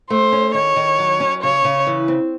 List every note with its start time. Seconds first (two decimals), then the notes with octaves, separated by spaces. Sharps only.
0.10 A3 C5
0.32 C#4
0.54 D#3 C#5
0.76 D#3
0.99 F#3
1.20 C#4
1.43 C#3 C#5
1.64 C#3
1.87 E3
2.08 C4